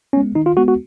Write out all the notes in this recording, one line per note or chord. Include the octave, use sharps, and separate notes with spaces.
G#3 B3 C#4
D#3 D#4
F4
G#3 B3 F#4
F#4